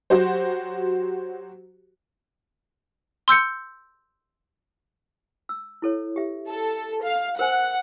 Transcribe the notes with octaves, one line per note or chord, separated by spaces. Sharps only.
F#3 F#4 G4 C5
C6 E6 G6 C#7
E6
E4 A4 C#5
G4 E5
A4
F5
A#4 C5 F#5 G#5